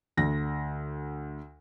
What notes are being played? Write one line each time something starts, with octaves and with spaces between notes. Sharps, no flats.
D2 A#6